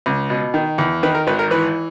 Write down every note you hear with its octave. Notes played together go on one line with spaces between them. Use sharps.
C#2
B2
D#3
E2
D#3 B4
A#4
G#1 B4
A#4
E3 B4